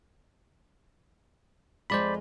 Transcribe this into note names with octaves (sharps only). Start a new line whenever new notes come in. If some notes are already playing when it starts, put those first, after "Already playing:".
F2 G#3 F4 C5 D5 B5